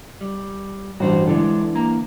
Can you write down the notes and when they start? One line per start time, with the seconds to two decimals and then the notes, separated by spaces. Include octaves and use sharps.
0.21 G3
1.00 A1 G2 F#4 C5
1.27 D3 E3 G#3 D4 A4
1.75 A#3 A#5